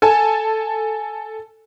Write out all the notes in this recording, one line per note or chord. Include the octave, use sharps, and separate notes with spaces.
A4 G#5 A5